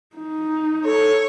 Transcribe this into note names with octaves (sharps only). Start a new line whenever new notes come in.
D#4
A4 C#5